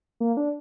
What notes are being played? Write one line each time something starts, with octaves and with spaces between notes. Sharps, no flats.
A#3
D4